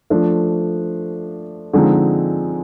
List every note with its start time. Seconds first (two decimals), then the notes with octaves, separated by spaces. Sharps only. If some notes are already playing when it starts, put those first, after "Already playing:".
0.10 F3 A3 D4
1.73 D3 F3 G#3 C4 D#4